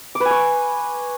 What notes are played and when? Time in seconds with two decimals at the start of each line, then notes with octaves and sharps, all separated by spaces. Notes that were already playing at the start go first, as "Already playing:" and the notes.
0.15 D6
0.20 B4
0.25 G#5
0.31 C#6